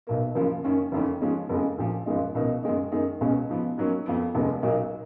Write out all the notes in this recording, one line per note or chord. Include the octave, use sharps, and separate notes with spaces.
B1 B2 A#3
F#1 F#2 C#3 F3 A#3
F#2 D#3 A#3 C#4
F#1 F2 D#3 A#3 C#4
G#2 F3 G#3 C#4
F#1 F2 C#3 G#3
A#1 A#2 F3
G#1 F#2 F3 G#3 D#4
C#2 B2 A#3 D#4
F#2 D#3 G#3 D#4
F#2 D#3 G#3 D#4
C#2 B2 G#3 C#4
G#2 F3 B3
G#2 F#3 A#3 C#4
F2 F3 B3
F1 D#2 C#3 G#3
B1 A#2 F#3 A#3 D#4